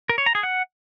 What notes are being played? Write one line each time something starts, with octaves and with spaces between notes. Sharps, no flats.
A#4
C#5
A#5
G#4
F#5